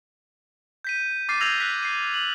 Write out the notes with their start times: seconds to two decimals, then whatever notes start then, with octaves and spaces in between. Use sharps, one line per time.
0.84 G6 B6 D#7
1.29 D6 F6 A6 C7 D#7
1.41 E6 F6 G6 G#6 A#6 F7
1.60 E6 F#6 B6
1.83 C7 D#7
2.14 F#7